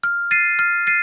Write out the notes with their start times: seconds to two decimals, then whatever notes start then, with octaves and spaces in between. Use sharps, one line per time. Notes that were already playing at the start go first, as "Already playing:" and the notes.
0.04 F6
0.31 A6 C7 D#7
0.59 F6
0.87 A6 C7 D#7